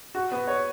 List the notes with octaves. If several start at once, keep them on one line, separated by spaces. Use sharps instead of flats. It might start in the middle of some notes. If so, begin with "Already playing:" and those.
F#4
B3
C#5